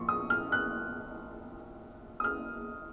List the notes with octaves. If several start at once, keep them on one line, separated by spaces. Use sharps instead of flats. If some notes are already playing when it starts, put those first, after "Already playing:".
Already playing: A#1 A#2 F3 C6 C#6
D#6
F6
F#6
D#6
F6